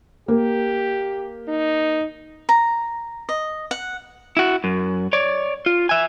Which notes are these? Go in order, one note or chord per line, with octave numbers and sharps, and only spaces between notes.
A#3 G4
D#4
A#5
D#5
F#5
E4 F#4
F#2
C#5 D5
F4
E5 G#5